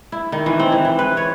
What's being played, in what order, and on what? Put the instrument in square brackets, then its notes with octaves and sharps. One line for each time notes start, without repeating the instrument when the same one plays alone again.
[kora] E4
D#3
E3
C4
E3
E3
B4
C#5